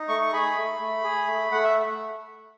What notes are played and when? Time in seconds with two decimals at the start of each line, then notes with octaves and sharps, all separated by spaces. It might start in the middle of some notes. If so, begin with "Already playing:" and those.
Already playing: D#4
0.08 A3 C#6
0.21 C#6
0.32 G#4 B5
0.57 A3
0.80 A3
1.04 G#4
1.27 A3
1.52 A3 F#5
1.63 E5